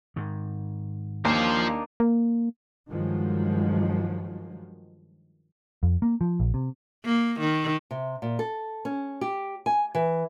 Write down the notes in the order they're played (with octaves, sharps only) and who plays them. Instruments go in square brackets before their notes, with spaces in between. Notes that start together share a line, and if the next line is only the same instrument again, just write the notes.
[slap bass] G#2 D#3
[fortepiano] D#2 [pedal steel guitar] A#3 D4 D#4 [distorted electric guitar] F4 C5
[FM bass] A#3
[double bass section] G2 D#3 F3 F#3 G#3
[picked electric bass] F2
A#3
F3
A#1
C3
[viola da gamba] A#3
D#3
[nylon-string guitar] C3
A#2
A4
C#4
G4
G#5
E3